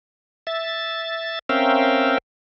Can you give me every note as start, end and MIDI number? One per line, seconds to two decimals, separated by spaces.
0.47 1.39 76
0.47 1.39 93
1.49 2.18 60
1.49 2.18 61
1.49 2.18 70
1.49 2.18 76
1.49 2.18 77
1.49 2.18 79